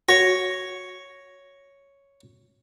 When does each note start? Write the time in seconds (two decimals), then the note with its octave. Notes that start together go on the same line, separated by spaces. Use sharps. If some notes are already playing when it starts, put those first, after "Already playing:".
0.09 F#4 C#5 A#6